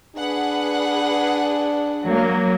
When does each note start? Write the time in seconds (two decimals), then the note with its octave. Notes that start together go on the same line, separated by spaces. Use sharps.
0.16 D4 G#4 B4 F#5
2.04 F#3 A#3